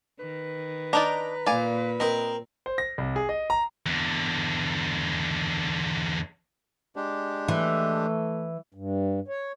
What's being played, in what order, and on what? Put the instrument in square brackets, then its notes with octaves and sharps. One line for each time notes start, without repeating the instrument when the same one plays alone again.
[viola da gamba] D#3 [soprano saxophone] B4
[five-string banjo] D4 D#4 D5 [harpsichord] A#5
[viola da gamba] A#2 [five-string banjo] D5 G#5 [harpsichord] F5
[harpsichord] C4 A#4 [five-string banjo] D#5
[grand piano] C5
A#6
C2
G#4
D#5
A#5
[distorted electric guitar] E2 D3
[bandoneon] G#3 D4 G4
[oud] E3 [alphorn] A3
[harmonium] G2
C#5